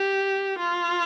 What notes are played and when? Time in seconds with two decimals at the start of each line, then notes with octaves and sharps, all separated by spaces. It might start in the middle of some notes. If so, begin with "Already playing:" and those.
Already playing: G4
0.59 F4